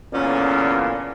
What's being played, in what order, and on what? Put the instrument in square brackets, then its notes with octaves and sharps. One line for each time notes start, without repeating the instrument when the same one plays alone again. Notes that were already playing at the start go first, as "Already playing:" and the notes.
[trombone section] E2 A#2 D3 [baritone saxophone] C#4